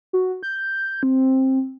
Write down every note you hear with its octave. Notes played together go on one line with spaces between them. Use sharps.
F#4
G6
C4